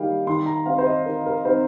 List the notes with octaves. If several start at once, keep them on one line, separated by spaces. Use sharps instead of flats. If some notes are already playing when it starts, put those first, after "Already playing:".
Already playing: D#3 G3 A#3 D#4 F5 G5
D#3 C6
A#5
C4 D#4 F5
C5
D#5
D#3 A#4
A#4
C4 D#4 C5